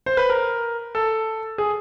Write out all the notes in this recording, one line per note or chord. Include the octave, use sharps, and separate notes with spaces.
C5
B4
A#4
A4
G#4